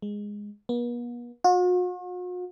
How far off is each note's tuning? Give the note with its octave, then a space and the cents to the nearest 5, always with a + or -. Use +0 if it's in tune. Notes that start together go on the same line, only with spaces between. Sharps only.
G#3 -10
B3 -45
F#4 -45